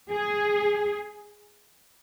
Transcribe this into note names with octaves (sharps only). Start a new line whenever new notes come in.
G#4